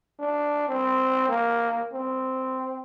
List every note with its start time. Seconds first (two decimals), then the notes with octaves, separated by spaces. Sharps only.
0.19 D4
0.68 C4
1.29 A#3
1.93 C4